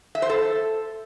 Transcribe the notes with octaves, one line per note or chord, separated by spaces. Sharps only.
E5
C5
A4